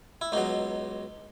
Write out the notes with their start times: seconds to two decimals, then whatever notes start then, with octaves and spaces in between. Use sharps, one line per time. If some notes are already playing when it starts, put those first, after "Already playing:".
0.21 E4
0.32 C#2 B2 F#3 D#4